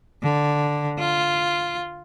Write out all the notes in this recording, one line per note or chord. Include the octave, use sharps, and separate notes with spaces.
D3
F4